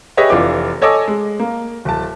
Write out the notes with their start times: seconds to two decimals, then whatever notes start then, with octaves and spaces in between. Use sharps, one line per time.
0.17 G4 G#4 B4 C#5 D#5 E5
0.30 F1 E3 D4 F4 D6
0.82 A4 C#5 D#5 G#5 D6 E6
1.08 G#3
1.40 A#3
1.85 D1 A5